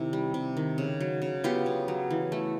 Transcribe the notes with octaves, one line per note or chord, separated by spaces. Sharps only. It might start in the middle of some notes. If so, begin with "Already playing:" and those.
Already playing: C3 D#3 E4
G3
C3
D#3
C#3
F#3
C#3
B3 F4 G4
C#3
F#3
E3
A3